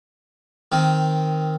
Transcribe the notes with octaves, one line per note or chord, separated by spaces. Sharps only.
D#3 C4